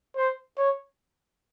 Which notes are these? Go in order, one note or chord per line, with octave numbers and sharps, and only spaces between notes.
C5
C#5